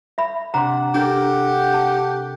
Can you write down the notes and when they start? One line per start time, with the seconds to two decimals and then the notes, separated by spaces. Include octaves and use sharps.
0.18 E5 B5
0.54 C3 D4 F#5 A#5 C6
0.95 D4 G4 A4 A#4
1.74 A5